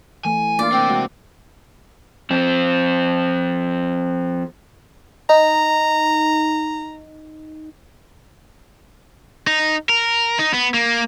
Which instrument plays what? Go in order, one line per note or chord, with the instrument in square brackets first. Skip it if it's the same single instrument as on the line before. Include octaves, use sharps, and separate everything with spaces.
[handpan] E3 A3 [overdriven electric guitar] G#5
[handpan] A#3 D4 [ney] F4 [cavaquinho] D5
[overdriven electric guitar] C3 C4 [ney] G5
[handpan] G#3 F#4 F#5
[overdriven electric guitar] F2 C4
[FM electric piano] D#4 [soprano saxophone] A#5
[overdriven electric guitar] D#4
A#4
D#4
B3
A#3